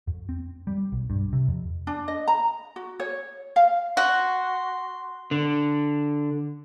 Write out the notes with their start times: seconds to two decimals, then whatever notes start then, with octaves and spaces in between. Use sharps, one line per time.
0.07 F2
0.29 C4
0.67 G3
0.92 B1
1.10 G2
1.33 C3
1.48 F2
1.87 D4
2.08 D#5
2.28 A#5
2.76 F#4
3.00 C#5
3.56 F5
3.97 F#4 C6
5.31 D3